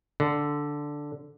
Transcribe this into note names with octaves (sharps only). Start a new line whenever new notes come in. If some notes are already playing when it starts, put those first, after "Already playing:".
D3